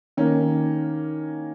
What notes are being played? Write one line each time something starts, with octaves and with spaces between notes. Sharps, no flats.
D#3 A#3 C#4